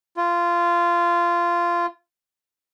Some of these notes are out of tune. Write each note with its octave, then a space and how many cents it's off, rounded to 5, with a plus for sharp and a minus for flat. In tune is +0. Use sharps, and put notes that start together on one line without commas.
F4 -15